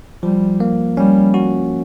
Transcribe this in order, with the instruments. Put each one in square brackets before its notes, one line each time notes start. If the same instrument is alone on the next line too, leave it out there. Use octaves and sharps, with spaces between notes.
[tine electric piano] F3 [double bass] G3
[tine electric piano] A#3
[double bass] G3 [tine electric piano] C#4
[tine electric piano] F#4